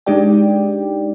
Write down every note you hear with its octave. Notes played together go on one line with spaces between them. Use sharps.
G#3 D4 D#4 G4 D5 G5